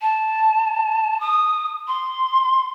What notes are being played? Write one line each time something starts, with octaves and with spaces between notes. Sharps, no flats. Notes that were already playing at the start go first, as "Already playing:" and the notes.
A5
D#6
C6